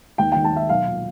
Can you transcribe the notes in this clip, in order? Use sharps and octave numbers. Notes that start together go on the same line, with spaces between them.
D#2 G5
D#3 G5
A5
D#3 E5
B1 F5
A#2